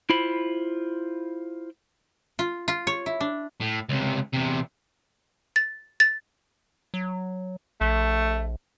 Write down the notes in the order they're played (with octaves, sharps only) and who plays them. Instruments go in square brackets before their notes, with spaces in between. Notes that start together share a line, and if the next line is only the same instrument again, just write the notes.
[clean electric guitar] E4 F4 C5 B5
[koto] F4
F4
C#5
E4
D4
[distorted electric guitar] A2
C#2 C3
E2 C3
[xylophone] A6
A6
[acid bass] F#3
[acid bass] A#1 [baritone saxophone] A3